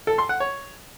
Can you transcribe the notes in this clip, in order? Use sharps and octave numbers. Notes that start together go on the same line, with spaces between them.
A4
C6
F#5
C#5